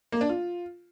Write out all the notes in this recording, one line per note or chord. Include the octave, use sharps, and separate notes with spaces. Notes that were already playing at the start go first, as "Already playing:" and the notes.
A#3
D4
F4